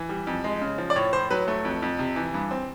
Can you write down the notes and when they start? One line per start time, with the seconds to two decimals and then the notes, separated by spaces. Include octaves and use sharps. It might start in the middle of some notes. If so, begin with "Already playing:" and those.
Already playing: E3
0.09 G3
0.27 F2
0.44 G#3
0.62 C#3
0.78 F3
0.90 D5
0.96 A2 C#5
1.13 A2 C5
1.30 F#3 B4
1.48 A3
1.65 F2
1.82 F2
1.99 C3
2.16 E3
2.34 G2
2.51 C4